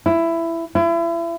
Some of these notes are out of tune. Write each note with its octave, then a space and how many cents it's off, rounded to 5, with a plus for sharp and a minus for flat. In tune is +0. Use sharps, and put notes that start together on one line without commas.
E4 +15
E4 +35